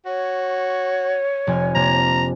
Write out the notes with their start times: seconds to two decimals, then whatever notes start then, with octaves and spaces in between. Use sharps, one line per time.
0.06 F#4 C#5
1.47 F1 G#5 F6
1.75 C3 A#3 D4 A#5